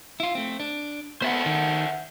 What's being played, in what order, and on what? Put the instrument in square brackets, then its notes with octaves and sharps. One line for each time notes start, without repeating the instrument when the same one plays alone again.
[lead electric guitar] E4 F4
A3 C4
D4
[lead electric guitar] B3 [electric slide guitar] C5 E5 F#5
[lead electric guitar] D#3